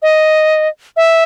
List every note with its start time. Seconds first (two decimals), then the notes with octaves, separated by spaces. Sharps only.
0.02 D#5
0.97 E5